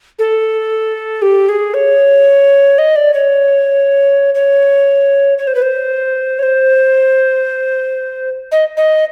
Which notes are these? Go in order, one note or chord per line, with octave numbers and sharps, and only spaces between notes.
A4
G4
G#4
C#5
D#5
D5
C#5
C#5
C#5
C5
B4
C5
C#5
C5
D#5
D#5